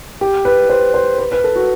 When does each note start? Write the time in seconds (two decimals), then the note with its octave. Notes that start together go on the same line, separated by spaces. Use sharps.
0.21 G4
0.45 B4
0.70 C5
0.94 C5
1.18 B4
1.32 B4
1.44 A4
1.56 F#4